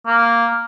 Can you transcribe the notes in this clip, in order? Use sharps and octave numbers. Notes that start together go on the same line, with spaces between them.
A#3